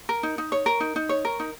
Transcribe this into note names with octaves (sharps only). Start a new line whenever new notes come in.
A#4
D#4
D#4
C#5
A#4
D#4
D#4
C#5
A#4
D#4